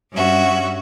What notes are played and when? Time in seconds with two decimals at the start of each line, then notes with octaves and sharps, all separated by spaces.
0.13 G2 C#4 F#4 E5